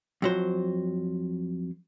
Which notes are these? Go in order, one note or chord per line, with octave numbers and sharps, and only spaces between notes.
F2 F#3 C5